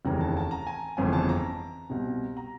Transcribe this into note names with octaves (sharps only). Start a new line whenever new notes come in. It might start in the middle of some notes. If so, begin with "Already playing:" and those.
F1 D#2 C#3 E3 A#5
A5
A5
A#5
G#5
G1 F2 C#3 E3 G#5
A5
A#5
C2 B2
A#5